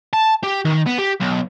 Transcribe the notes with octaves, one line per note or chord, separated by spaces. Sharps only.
A5
G4
D#3
B3
G4
B1